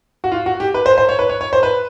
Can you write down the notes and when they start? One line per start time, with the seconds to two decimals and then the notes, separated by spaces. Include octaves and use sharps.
0.24 F#4
0.32 F4
0.46 F#4
0.60 G4
0.74 B4
0.86 C5
0.98 C5
1.09 C#5
1.19 B4
1.29 C#5
1.41 C#5
1.53 C5
1.63 B4